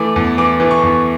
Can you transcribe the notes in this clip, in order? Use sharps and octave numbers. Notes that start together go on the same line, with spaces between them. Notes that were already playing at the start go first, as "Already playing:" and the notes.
Already playing: E3 A3 D6
E2
E3 D6
E3
C#6
E2